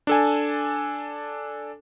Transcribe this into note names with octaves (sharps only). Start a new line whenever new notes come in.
D4 A4 G#5